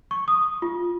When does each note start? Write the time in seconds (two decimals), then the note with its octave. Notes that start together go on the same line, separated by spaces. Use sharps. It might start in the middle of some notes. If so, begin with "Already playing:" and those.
0.11 C#6
0.28 D#6
0.62 F4